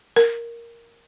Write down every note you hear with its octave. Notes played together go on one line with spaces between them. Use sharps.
A#4